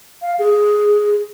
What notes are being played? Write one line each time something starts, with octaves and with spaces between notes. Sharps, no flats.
F5
G#4